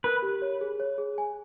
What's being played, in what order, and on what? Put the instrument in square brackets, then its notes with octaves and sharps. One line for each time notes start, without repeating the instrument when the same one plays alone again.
[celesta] A#4 [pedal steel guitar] B4
[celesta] G4
C#5
G#4
C#5
G#4
G#5